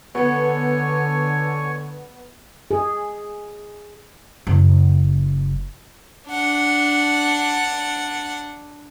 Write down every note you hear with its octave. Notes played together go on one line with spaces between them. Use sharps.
D3 B3 C#5 G#5 C#6
G#4
F#1
D4 F#5